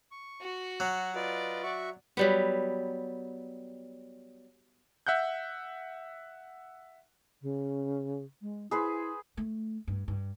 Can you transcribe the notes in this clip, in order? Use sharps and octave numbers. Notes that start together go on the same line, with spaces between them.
C#6
F#4
F#3
F4 B4 D5 D#5
F#4 E5 C#6
F#3 G3 B3
E5 F#5 F#6 G6
C#3
G#3
E4 G#4 B4 C5
A3
G2
G2